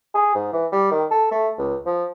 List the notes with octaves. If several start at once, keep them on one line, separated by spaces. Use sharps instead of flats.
G#4
G#2
E3
G3
D#3
A4
A3
C#2
F3